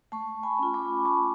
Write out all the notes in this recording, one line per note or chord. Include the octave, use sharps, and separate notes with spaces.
A3 A5 C#6
G#5 B5
C#4 F4
B5 D6
A3 A5 C#6